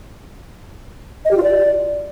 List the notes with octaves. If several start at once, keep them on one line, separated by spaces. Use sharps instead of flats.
D#5
G4
F4
D5